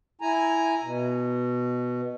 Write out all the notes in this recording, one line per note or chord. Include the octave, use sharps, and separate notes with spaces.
E4 G#5 A#5
B2